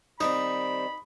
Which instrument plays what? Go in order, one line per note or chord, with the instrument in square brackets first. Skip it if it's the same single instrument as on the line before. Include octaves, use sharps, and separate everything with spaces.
[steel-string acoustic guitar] D#3 G3 C4 [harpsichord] D#4 [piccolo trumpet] B5